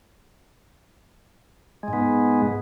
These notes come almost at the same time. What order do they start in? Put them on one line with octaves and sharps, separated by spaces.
G#3 G#2 B3